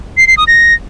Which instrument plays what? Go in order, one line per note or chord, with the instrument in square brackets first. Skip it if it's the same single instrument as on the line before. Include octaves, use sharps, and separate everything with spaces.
[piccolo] C7
C7
D#6
A#6